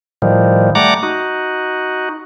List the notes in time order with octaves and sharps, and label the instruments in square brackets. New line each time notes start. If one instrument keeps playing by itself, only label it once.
[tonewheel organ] A2 D#3 F3 G3
G3 A3 F#5 A#5 D6
D#4 F#4